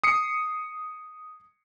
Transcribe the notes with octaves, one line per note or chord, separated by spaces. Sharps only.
D#6 C7 C#7